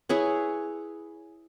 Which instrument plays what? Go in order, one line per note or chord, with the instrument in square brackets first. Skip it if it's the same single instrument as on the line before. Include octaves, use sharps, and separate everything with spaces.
[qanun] E4 G#4 B4 C#5